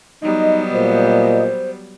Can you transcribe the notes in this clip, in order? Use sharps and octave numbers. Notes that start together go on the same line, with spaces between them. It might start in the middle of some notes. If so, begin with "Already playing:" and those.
F#3 G3 B3 D#4 D#5
A#2 C5